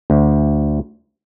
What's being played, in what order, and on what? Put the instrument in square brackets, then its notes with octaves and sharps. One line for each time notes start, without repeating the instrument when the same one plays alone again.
[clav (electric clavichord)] D2